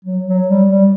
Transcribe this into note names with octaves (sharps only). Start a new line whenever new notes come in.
F#3
F#3
G3
G3